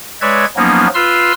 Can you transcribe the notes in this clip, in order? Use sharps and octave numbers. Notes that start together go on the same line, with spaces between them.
G#3 B4 C#5 D5 E5 G#6
F3 F#3 A#3 B3 C#4 D#4
F4 B4 C6 E6 F6